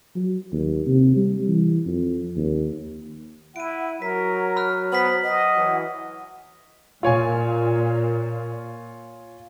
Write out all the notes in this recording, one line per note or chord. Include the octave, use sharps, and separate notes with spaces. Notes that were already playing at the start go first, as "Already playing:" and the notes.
F#3
D#2
C3
G3
E3
F2
D#2
E4 F#5 D7 D#7
F#3 A#4 B6
B5 F6 F#6
B3 C5 B6 F#7
D#5 F#5
E3 F#3
A#2 F4 C#5 G#5